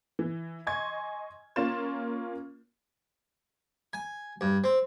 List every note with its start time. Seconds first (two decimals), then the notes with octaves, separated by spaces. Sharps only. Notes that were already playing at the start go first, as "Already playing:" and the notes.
0.19 E3
0.67 D#5 G#5 C6 C#6 G#6
1.56 A#3 C#4 F4 C6 A6 E7
3.93 G#5
4.41 G2
4.64 C4